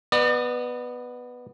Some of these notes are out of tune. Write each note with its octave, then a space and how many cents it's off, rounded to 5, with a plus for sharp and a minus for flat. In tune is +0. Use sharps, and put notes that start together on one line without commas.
B3 +0 D5 +40